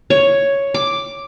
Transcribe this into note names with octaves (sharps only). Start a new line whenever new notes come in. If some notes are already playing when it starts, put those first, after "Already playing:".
C#5
D6